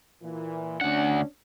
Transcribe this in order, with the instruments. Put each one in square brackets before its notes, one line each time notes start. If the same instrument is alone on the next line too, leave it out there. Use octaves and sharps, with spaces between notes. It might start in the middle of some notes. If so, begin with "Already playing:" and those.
[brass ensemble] A#2 E3
[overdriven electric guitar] D2 F#5 [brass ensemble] C#4 D4